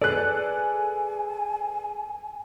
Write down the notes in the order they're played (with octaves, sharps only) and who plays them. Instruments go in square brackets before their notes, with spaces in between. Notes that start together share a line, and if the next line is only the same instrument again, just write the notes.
[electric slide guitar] G#4 B4 D5 [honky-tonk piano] A4 F#6 [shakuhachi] G#5